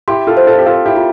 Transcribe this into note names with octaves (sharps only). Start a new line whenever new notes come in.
E4 G4 C6
F4 A4
C5
F4 A4
G4
F4 A4 F5
E4 G4
F4